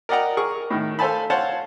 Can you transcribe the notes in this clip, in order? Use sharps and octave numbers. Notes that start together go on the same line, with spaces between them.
A#4 D5 D#5 F#5 G5 A#5
G#4 A#4 C#6
A2 D#3
A4 C5 F5 G#5 A5 B5
C5 C#5 F5 F#5 A5 C6